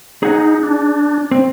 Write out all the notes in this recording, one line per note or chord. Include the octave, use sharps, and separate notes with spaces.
D#4 G#4 F#5
D4
C4